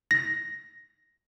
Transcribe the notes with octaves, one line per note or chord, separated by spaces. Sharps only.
A#6